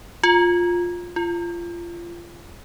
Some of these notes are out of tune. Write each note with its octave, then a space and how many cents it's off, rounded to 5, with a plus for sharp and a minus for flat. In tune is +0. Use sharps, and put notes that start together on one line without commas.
F4 +10
F4 -25